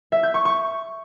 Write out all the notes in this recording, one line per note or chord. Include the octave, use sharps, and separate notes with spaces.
E5
G6
C#6
C#6